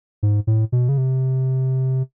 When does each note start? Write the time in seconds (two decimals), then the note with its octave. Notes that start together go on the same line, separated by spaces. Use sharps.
0.23 G#2
0.47 A2
0.72 B2
0.89 C#3
0.98 C3